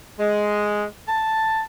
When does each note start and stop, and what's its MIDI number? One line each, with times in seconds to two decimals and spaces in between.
0.19 0.85 56
1.08 1.62 81